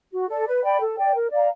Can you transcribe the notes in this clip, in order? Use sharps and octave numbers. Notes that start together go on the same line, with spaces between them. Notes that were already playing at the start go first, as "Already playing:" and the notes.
F#4
A4 D5
B4
D5 G5 B5
A4
D5 G5
A#4
D5 F5 A#5